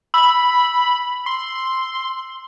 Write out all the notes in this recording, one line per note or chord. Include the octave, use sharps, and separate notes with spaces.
B5 E6
C6